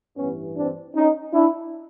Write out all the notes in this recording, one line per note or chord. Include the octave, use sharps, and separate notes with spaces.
A1 G2 E3 B3 C#4
C4 D4
C#4 D#4
D4 E4